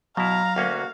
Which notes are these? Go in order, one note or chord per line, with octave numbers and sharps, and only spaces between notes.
B2 F#3 E4 F5 A#5
D2 A#3 C#4 F#4